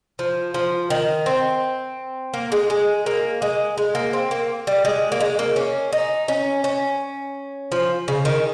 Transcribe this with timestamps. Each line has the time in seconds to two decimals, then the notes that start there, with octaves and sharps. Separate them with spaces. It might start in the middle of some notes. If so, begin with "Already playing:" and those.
0.19 F3
0.54 F3
0.90 D#3
1.26 C4
2.34 A#3
2.52 G#3
2.70 G#3
3.06 A#3
3.42 G#3
3.78 G#3
3.95 A#3
4.13 C4
4.31 A#3
4.67 G3
4.85 G#3
5.12 A#3
5.20 G#3
5.39 A#3
5.56 C#4
5.93 D#4
6.28 C#4
6.64 C#4
7.72 F3
8.08 C#3
8.25 D#3